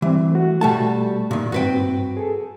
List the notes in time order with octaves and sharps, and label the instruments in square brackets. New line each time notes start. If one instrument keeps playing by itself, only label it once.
[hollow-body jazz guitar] E3 [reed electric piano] G3 C4
[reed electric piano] A3 F#4
[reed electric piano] B2 A3 [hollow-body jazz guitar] G3 F#4 A5
[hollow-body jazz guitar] A#2 D#3
[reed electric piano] G2 C4 [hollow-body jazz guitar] F#4 B4 G5
[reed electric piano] G#4 A4